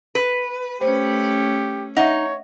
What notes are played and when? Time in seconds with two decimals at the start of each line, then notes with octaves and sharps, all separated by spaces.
0.15 B4
0.81 A3 C#4 G4 C5
1.97 D#4 C#5 E5 F#5